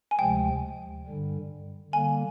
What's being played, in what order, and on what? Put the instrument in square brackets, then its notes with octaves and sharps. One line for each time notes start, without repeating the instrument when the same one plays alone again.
[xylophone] G#5
[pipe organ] D2 C3 F3 G#3 [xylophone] G5
[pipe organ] G2 D3 G3
[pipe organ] D3 G3 A#3 [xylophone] G#5